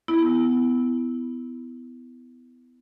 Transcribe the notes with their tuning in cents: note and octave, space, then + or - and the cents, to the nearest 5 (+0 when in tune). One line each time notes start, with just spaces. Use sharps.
B3 +20 E4 +0